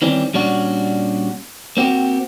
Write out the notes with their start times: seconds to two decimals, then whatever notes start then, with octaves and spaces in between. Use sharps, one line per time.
0.02 D#3 E3 G3 C4 C#4
0.34 A#2 G3 C#4 D4 F#4
1.77 A#3 C4 F#4 G4